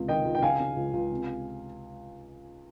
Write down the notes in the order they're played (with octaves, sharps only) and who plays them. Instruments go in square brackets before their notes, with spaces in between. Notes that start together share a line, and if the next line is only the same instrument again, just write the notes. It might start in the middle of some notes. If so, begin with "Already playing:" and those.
Already playing: [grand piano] C#2 C3
D#3 D#5 G5
C#2
G5
C#3 F5 G#5
C#3
C#2
C#2
C3